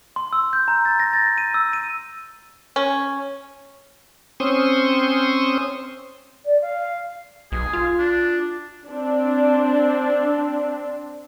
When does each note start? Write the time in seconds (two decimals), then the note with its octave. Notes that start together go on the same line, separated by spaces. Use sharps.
0.16 C6
0.33 E6
0.53 G6
0.68 A#5
0.85 A6
1.00 A#6
1.13 A6
1.38 D#7
1.54 E6
1.73 D#7
2.76 C#4
4.40 C4 C#4 C5 C6 C#6 D#6
6.45 D5
6.61 F5
7.52 B1 G#4
7.73 F4
7.98 D4
8.88 C4 D4